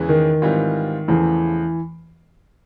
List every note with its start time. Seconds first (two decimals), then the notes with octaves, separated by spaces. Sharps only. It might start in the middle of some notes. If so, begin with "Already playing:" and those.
Already playing: E2 C#3 E3 G#3
0.09 D#3
0.42 G#2 E3 G3 C4 F4
1.08 E2 C#3 E3 F3 A3